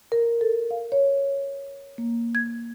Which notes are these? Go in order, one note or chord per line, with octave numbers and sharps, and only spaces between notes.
A#4
A4
F5
C#5
A#3
G#6